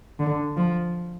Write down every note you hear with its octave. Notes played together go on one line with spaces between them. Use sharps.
D3
F3